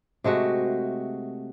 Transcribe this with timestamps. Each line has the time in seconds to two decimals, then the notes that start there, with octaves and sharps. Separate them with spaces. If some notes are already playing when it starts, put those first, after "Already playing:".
0.24 C3 G#3 A3 F#4